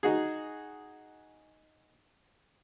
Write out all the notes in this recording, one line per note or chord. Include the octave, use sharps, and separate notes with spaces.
D#4 F#4 G#4